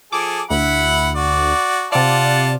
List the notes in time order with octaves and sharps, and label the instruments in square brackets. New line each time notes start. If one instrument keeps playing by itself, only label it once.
[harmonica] F3 G#4 A4 [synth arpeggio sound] D6
[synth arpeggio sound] D2 [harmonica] E4 F#5 B5
[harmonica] F#4 D5
[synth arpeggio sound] C3 D5 [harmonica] F4 F#5 A5